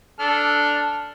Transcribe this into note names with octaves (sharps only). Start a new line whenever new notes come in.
D4 A4 F6